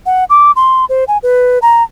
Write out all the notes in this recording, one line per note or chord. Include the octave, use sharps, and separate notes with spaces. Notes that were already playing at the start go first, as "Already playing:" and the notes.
F#5
D6
C6
C5
G#5
B4
A#5